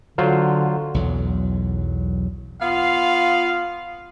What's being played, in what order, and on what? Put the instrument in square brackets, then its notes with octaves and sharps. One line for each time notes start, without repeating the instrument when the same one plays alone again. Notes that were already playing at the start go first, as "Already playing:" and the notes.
[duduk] D3 [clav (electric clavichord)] F#3 F4 C5
[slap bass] B1 E2 F#3
[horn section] B3 F4 F5